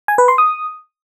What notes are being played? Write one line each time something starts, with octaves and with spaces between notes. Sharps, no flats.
G#5
B4
C6
D#6